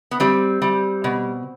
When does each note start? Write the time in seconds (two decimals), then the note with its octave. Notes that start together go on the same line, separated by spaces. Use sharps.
0.11 B3
0.20 G3 C4
0.62 G3
1.04 B2